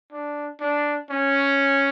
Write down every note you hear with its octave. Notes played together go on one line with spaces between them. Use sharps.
D4
D4
C#4